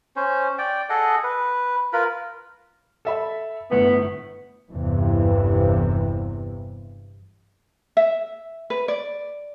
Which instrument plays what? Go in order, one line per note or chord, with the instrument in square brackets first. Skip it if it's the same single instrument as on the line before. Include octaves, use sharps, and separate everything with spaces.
[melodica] C#4 C5
D5 G5
G#4 A4 D#5 F#5
B4
F4 A#4 B4 B5
[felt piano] A4 E5 B5
[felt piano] G1 A2 [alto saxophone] B3
[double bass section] G1 E2 G2 C3 E3
[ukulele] E5
B4
D5